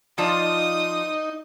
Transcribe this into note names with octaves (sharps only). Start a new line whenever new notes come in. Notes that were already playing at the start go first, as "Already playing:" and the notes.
F3 D#4 F4 D5 D#5 A5 D#6